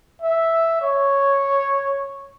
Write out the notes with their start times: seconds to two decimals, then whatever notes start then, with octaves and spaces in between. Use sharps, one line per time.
0.22 E5
0.82 C#5